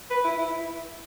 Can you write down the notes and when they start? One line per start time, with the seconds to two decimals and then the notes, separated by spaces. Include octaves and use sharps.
0.10 B4
0.25 E4
0.38 E4